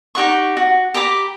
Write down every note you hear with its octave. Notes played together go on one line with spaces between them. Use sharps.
D#4 G4 F#5 C#6
F#4
G4 A#5 B5 D6